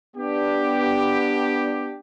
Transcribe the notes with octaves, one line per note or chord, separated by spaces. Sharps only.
B3 D4 G4